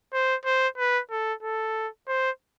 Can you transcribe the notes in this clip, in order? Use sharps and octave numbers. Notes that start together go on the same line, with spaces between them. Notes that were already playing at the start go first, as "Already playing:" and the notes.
C5
C5
B4
A4
A4
C5